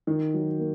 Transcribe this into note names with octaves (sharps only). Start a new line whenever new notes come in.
D#3
F#3
A#3